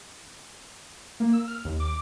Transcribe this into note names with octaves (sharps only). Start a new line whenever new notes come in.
A#3
E6
F6
D#2
D6